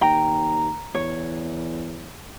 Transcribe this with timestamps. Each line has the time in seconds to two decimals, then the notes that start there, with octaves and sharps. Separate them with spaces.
0.01 D#2 G5 A#5
0.95 E2 C#5